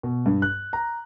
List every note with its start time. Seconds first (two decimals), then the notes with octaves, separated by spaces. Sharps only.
0.03 B2
0.26 G2
0.42 F#6
0.73 A#5